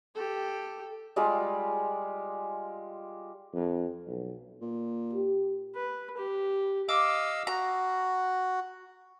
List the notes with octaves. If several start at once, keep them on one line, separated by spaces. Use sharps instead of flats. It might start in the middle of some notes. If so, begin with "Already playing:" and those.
G4 A4
G3 G#3 F4 G4
F2
B1
A#2
G4
B4
G4
D#5 F5 D6 E6
F#4 A#5